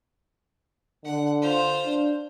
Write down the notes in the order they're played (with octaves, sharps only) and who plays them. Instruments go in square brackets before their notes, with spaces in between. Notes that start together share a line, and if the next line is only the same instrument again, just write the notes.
[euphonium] D3 [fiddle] F#5
[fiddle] F4 C5
[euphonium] D4